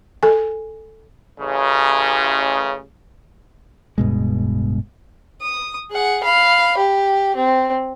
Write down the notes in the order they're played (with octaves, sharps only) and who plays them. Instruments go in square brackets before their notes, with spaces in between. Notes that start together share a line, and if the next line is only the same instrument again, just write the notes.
[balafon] A4 G#5
[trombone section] A1 C#3
[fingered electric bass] D1 G2 B2 G#3
[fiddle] D#6
G#4 F#5
F5 B5
G4
C4